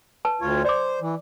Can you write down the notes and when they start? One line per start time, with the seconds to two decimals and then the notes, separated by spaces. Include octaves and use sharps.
0.25 B4 A5
0.41 D2 F4 C#5
0.65 C5 D5 D6
1.01 E3